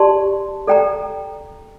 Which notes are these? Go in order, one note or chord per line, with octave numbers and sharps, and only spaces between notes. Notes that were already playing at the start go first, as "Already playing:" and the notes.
Already playing: G4 D5 A5 C6
A4 D5 G5 A#5